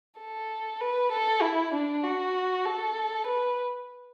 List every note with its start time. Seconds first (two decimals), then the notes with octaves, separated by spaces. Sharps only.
0.19 A4
0.81 B4
1.12 A4
1.42 E4
1.73 D4
2.03 F#4
2.65 A4
3.27 B4